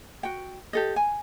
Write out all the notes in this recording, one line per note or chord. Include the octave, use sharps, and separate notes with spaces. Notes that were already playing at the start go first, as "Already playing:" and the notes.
F#4 G5
G4 A4 D#5
G#5